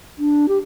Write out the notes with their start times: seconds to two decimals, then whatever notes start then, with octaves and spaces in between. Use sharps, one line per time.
0.19 D4
0.48 G4